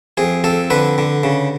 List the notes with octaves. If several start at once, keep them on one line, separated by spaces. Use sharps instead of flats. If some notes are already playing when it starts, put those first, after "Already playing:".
F2 G#4
F2 A4
D3 B4
D3
C#3